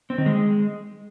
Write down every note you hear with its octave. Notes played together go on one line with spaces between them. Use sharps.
C4
D#3
G#3